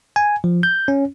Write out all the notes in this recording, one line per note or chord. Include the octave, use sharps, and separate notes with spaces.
G#5
F3
G6
C#4